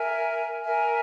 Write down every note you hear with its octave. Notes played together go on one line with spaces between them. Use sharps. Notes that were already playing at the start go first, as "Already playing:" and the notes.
Already playing: A#4 E5 G#5
A#4 E5 G#5